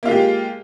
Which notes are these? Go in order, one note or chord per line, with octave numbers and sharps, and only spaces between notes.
G#3 A#3 F4 G4